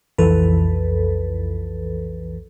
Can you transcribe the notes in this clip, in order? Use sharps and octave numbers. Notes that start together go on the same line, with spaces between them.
B1 F2 E3 A4 B4